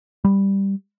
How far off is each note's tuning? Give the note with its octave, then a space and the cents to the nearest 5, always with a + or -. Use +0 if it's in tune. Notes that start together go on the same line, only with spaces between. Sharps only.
G3 +5